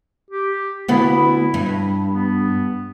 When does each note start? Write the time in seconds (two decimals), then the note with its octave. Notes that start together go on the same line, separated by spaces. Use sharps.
0.30 G4
0.88 D2 B3 E4
1.54 G2
2.11 B3